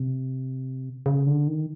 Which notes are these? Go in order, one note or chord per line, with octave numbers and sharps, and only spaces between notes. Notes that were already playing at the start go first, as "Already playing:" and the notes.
Already playing: C3
C#3
D3
D#3